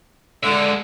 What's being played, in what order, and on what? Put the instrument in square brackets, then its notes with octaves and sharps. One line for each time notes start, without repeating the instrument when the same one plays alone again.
[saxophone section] D3 [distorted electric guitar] G#3 E5